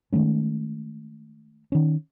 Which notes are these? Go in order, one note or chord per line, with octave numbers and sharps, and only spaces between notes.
D#3 G#3 A3 C#4
D#3 C#4